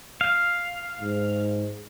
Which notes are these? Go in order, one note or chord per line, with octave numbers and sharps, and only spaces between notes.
F5
G#2